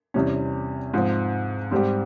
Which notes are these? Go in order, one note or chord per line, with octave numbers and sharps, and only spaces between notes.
E2 C3 G3 C#4
G#2 F3 C4
G#2 G3 C4 G4